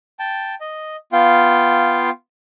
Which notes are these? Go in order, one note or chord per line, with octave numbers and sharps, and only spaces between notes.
G5 A5
D#5
B3 F4 F5 G5